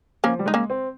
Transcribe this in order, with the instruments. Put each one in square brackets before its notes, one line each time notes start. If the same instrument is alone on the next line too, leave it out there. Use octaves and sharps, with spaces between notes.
[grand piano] F3 [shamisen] A#3 C#4
[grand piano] G3
[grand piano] G#3 [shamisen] D#4
[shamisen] A#3 C#4
[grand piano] C4